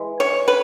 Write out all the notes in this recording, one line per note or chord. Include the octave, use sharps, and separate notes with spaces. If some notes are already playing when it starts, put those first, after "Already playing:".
Already playing: E3 G#3
C#5
B4